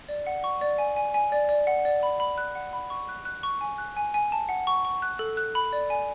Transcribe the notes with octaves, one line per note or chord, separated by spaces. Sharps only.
D5
F#5
C#6
D5
G#5
G#5
G#5
D5
D5
F#5
D5
B5
B5
F#6
F#5
B5
C#6
F#6
F#6
C#6
G#5
F#6
G#5
G#5
A5
F#5
C#6
C#6
F#6
A4
F#6
B5
D5
G#5